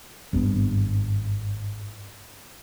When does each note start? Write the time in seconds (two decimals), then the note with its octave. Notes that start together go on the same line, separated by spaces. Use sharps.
0.33 G#1 G2 C3 B3